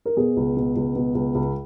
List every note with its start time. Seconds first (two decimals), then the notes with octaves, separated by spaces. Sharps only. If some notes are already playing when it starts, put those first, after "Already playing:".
0.06 A#4
0.17 B2 G#4
0.37 C#2
0.57 B2
0.76 C#2
0.96 B2
1.15 C#2
1.35 C#2